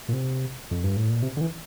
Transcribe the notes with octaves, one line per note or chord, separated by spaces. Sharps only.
A#2
C3
F2
G2
A2
A#2
C3
D3
E3